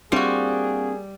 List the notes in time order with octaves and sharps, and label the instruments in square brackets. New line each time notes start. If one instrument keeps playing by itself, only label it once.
[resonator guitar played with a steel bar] G3 [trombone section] A#3 G#4 [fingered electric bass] C4 D4 [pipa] F4 F#4